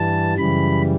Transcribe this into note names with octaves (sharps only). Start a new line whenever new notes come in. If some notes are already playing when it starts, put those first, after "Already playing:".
Already playing: G2 E3 G3 A5
F#2 C#3 E3 G3 B5